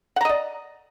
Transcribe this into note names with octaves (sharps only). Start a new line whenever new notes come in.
D5 D#5 F#5 A#5